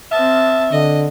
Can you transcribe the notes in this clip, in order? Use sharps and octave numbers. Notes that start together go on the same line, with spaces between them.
C4 E5 A5
D3 D#5